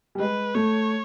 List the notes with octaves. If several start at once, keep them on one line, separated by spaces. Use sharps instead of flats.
G3
G#3 B4
A3 C#5